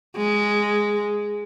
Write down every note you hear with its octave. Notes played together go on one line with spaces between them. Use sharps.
G#3